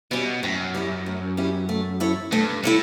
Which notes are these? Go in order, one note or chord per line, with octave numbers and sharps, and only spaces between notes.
B2 G3 C#4 E4
F#2 A2
G3 C#4 E4
A2
G3 C#4 E4
A3
E4 A4 C#5
G2 A3
A2 E4 A4 C#5